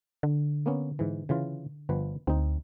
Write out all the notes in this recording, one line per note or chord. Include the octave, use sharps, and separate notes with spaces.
D3
A#3 B3 C#4
G#2 E3
C#3 E3 F4
G1 F3 B4
D2 C4 D#4